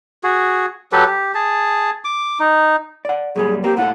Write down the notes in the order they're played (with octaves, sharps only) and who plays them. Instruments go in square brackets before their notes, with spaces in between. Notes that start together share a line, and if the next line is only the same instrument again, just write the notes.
[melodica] F#4 G#4
F#3 G4 A4 B4
G4
G#4 A5
D6
D#4
[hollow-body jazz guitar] D5 F#5
[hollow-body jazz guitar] F#2 A#2 G3 [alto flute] G#4
[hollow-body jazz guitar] A#3 C4 [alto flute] G4
[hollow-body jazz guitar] A2 F4 A4 [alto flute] F#5